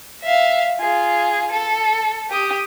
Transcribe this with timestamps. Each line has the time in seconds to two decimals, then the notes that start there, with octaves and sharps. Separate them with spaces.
0.23 E5 F5
0.79 F4 G#4
1.52 A4
2.31 G4 D#6